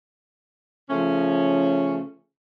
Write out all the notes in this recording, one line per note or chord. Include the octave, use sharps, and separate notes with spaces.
C#3 F3 A3 C#4